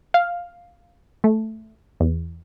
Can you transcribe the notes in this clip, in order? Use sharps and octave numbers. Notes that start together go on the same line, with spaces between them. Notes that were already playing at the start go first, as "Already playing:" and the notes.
F5
A3
E2